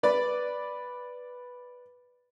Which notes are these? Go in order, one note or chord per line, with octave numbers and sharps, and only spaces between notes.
B4 D5 B5